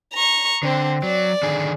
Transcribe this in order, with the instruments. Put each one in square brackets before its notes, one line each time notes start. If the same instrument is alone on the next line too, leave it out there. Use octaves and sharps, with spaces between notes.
[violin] A#5 C#6
[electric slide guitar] D3 [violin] C4
[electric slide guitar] F#3 [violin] D5
[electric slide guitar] D3 D#3 G#4